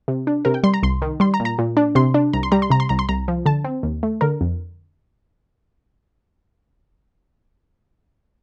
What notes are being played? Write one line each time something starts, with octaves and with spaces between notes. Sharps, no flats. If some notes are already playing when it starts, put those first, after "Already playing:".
C3
D4
C3 A#4
G5
G3 C6
A#5
C2 C6
D#3
G3 C6
A#5
A#2
A#5
A#2
D4
C3 C6
D4
C2 A#5
C6
G3 A#5
C6
C3 A#5
C6
C2 A#5
C6
C2 A#5
F3
D3 A5
C4
D#2
A3
D3 A#4
F2